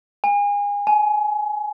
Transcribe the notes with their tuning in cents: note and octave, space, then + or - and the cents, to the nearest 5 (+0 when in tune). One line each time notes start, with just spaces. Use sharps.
G#5 -30
G#5 +25